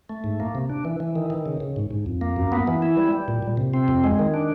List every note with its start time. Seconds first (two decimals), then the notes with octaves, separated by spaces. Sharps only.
0.09 A3
0.24 G#2
0.40 A#3
0.55 C3
0.70 D4
0.85 E3
1.00 E3
1.16 D#3
1.30 D#3
1.46 C#3
1.60 C#3
1.76 G#2
1.91 G#2
2.06 F2
2.21 A#3
2.36 F#2
2.52 B3
2.68 E3
2.82 E4
2.97 G3
3.13 G3
3.28 A#2
3.42 A#2
3.57 C3
3.74 C4
3.88 F2
4.04 G#3
4.19 D#3
4.34 D4